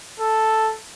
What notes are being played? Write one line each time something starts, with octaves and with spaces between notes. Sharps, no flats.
A4